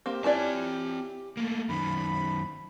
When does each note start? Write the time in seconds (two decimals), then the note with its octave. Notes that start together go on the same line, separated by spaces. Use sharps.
0.06 A#3 C4 G4
0.24 C4 C#4 E4 D5 A5
1.37 A3 A#3
1.69 F#2 D#3 B5